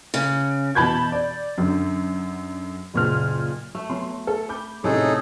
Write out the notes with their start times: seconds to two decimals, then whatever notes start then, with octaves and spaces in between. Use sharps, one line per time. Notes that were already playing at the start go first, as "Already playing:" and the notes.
0.14 C#3
0.75 B2 E3 A5 B5 G6 G#6
1.12 D5
1.58 F#2 D3
2.94 F#1 A#2 F6
3.75 A3
3.90 F#3 B3 C6
4.27 A4
4.49 B5 D6 G6
4.84 A2 C3 A3 C#4 D#4 G#4 A4